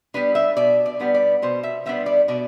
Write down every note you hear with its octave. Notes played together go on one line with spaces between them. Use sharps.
G3 B3 D4 B4
E5
B2 D5
D5
G3 B3 D4
D5
B2 C5
E5
G3 B3 D4 E5
D5
B2 D5